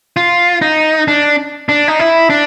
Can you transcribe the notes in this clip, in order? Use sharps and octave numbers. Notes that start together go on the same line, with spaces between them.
F4
D#4
D4
D4
D#4
E4
D4